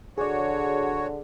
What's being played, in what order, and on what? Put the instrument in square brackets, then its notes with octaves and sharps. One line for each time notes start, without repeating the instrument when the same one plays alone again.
[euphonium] D3 [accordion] F#4 C#5 [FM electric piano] G#4 D5